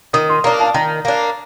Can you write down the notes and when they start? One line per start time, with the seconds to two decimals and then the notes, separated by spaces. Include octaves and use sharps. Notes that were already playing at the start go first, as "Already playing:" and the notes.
0.13 D#3 D#6
0.29 C6
0.44 A#3 D4 A#5
0.60 A5
0.74 D#3 A#5
1.05 A#3 D4